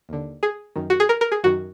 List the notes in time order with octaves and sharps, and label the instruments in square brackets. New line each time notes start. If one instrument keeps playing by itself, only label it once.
[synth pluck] D#2 D3
G#4
F#2 D#3
F#4
G#4
A#4
A#4
G#4
F#2 D#3 F#4